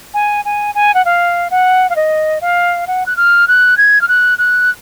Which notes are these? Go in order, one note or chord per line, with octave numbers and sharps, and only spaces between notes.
G#5
G#5
G#5
F#5
F5
F#5
F5
D#5
F5
F#5
F#6
F6
F#6
G#6
F6
F#6
F#6